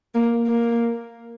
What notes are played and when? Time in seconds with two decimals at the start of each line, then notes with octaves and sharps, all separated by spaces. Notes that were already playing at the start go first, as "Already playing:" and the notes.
0.15 A#3
0.47 A#3